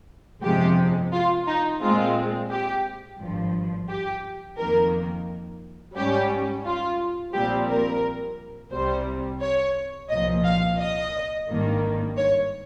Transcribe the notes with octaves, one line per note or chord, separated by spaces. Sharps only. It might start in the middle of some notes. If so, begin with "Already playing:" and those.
G1 F2 C3 F3 G#3 G4
F4
D#4
A#2 G#3 C4 F4
G4
G#1 G2 F3
G4
F2 D#3 A#3 A#4
G#2 G3 C#4 G4
F4
A#1 A#2 G3 C4 G4
A#4
C2 C3 G3 C5
C#5
C2 A#2 F3 D#5
F5
D#5
G#1 G2 D#3 A#3
C#5